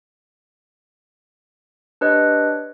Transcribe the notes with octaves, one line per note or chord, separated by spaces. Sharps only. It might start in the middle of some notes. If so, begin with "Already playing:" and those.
D4 G4 B4 C#5 D#5